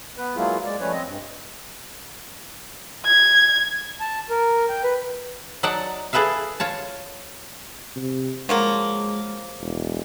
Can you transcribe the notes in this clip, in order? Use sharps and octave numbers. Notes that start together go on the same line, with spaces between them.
B3 B4
F#3 G#3 A#3 E4 F4 G#4
G#3 D5
F3 G3 A3 C#4 B4 C#5
C4 D#5
G2
G#6
A5
A#4
G5
B4
F#3 D#4 D5 F#5 A5
E4 G#4 A4 B4 E5 F5
F4 C#5 A5
C3
F3 F#3 G#3 A#3
E1